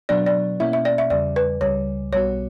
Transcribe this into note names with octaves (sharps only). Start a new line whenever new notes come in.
B2 F#3 B3 D4 D5
D5
B2 A#3 C#4 E4 E5
E5
D5
E5
E2 C#3 G3 D5
B4
C#2 C#3 G3 C#5
B1 B2 G3 B3 F#4 C#5